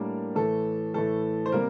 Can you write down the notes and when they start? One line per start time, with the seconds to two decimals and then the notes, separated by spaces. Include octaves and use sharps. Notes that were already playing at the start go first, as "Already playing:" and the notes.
Already playing: A2 G3 A#3 D4 A#4
0.35 A2 E3 A3 A4
0.94 A2 E3 A3 A4
1.46 C5
1.52 C3 G3 A#3 A#4